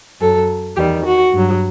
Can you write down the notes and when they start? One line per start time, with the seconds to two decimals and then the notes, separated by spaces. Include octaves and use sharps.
0.20 F#2 F#3 A4
0.76 E2 D#3 G3 G4
1.05 F#4
1.33 G2 F#3